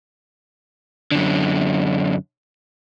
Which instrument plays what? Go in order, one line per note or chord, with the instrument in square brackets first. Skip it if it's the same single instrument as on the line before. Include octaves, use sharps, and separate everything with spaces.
[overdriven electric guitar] F#2 D3